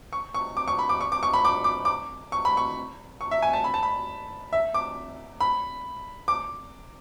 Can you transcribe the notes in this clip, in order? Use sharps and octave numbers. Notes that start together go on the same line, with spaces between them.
C#6
C#6
D6
C#6
B5
D6
C#6
D6
C#6
B5
D6
D6
D6
C#6
B5
C#6
C#6
E5
G#5
A5
B5
A5
B5
E5
D6
B5
D6